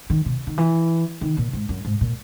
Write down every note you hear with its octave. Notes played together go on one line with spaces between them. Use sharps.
D#3
B2
D#3
E3
D#3
A#2
G#2
F#2
G#2
A#2